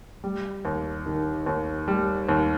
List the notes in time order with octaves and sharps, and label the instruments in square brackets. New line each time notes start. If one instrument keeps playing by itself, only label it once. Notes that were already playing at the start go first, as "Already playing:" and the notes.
[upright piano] G3
D#2
D#3
D#2
G3
D#2